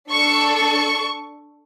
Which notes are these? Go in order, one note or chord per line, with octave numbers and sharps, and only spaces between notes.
D4 A4 C#6
C#6